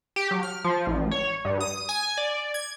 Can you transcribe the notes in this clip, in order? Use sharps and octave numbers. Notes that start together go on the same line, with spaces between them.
G4
F#3
F6
F3
A1
C#5
G2
D#6
G#5
D5
G#6